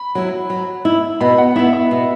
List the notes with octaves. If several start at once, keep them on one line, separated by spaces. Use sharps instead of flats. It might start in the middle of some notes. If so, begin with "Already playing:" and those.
Already playing: B5
F#3 E4
F#3
E4
B2 B5
F#5
B3 E4 E5
E5
B2